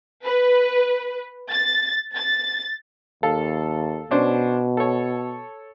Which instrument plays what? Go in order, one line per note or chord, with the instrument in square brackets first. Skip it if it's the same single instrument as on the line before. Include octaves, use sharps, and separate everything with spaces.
[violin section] B4
A6
A6
[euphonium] D#2 [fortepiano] A4 F5
[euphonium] B2 [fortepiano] C#4 D4 C5
[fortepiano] A4 C#5